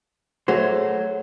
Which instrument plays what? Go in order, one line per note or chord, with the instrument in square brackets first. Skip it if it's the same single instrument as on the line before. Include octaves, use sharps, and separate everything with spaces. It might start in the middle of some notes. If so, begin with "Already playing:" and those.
[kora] F#3 [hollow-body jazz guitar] A3 G#4 C5